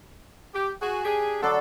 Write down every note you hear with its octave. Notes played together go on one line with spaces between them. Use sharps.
G4
F#4 G#4
D4 G4 G#4
D3 F#3 D4 A4